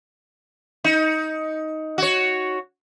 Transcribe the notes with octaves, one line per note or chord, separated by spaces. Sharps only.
D#4
F#4 C#5